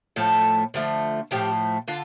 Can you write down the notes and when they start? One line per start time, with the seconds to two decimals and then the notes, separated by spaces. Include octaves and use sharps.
0.16 A2 F3 A3 A4
0.74 D3 F3 A3
1.31 A2 F3 A3 G4
1.88 D3 F4